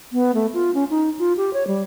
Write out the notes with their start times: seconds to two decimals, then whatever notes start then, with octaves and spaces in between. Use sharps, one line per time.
0.13 B3
0.35 A3
0.54 F4
0.74 C#4
0.90 D#4
1.19 F4
1.37 G4
1.53 C#5
1.67 G3